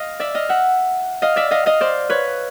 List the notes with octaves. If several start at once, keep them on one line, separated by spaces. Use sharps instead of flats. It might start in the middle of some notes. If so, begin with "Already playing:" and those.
Already playing: D#5 F5
D5 E5
D#5 F5
E5 F#5
D#5 F5
D5 E5
D#5 F5
D#5 F5
C5 D5
B4 C#5